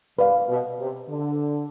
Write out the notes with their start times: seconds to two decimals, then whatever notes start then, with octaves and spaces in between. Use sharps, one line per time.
0.19 G2 B4 D5 F5
0.49 B2
0.79 C3
1.09 D3